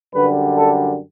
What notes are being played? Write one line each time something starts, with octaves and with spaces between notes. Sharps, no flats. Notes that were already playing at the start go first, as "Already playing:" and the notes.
F#2 D3 G3 B4
A4